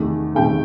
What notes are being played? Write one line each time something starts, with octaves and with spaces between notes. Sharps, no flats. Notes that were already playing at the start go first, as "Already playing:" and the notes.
Already playing: E2 C3 D#3 A3
E2 C3 D#3 A3 G5